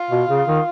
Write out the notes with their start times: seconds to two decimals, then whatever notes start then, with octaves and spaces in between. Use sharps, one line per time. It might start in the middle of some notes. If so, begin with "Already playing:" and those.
Already playing: F4
0.11 B2
0.29 C#3
0.47 D#3